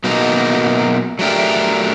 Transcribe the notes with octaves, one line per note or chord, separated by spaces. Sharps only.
B2 F#3 A#3 D#4
F#3 A3 D4 G4 A#4